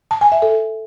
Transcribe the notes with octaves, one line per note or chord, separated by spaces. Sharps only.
A5
G#5
E5
A4